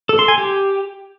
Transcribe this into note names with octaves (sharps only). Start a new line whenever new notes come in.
A4
C6
G#5
G4